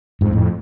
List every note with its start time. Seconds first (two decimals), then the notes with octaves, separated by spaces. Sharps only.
0.21 F2 G#2
0.33 F2 A2